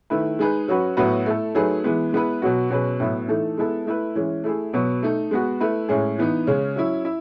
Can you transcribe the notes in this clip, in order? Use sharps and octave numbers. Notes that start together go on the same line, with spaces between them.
D#3 A3 E4 B4
G#3 D#4 G#4 B4
F#3 C#4 F#4 B4
A2 F#3 B3 F#4 B4
A3 E4 A4
F#3 A3 D#4 G#4 B4
E3 G#3 B3
G#3 B3 E4 B4
B2 F#3 B3 F#4
B2 F#3 C#4 G#4 B4
A2 F#3 B3 E4
E3 A3 D#4 A4
G#3 B3 E4 A4
A3 E4 B4
E3 G#3 C#4
A3 E4 G#4
B2 F#3 B3
A3 D#4 A4
G#3 B3 F#4
A3 E4 B4
A2 G#3 C#4 G#4
E3 B3 D#4
C#3 G#3 C#4
F#3 C#4 E4
E4